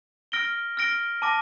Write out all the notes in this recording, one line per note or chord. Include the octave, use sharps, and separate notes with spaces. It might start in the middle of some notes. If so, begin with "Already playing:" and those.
F6 A#6 D7 G7
F6 A#6 D7 G7
A5 D6 F6 A#6